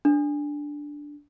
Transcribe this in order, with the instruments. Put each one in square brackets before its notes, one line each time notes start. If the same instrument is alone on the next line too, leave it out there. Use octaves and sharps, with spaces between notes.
[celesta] D4